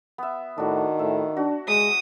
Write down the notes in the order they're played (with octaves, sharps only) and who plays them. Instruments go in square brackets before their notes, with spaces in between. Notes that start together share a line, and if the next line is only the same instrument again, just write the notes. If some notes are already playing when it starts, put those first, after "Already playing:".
[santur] B3 E5
[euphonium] A2 [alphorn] D#3 [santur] D4 F#4
[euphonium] A2 [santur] E5
[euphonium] D4 [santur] F#4
[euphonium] G#3 [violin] D#6